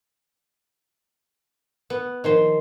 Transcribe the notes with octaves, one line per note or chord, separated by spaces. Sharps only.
B3
D#3 F3 C5